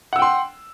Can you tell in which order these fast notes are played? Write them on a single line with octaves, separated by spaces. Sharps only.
F#5 E6 G5 C6